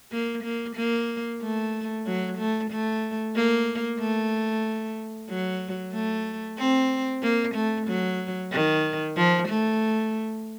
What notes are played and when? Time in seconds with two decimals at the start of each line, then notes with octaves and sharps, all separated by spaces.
0.12 A#3
0.44 A#3
0.76 A#3
1.41 A3
2.06 F#3
2.38 A3
2.71 A3
3.35 A#3
4.00 A3
5.29 F#3
5.94 A3
6.58 C4
7.23 A#3
7.55 A3
7.88 F#3
8.52 D#3
9.17 F3
9.49 A3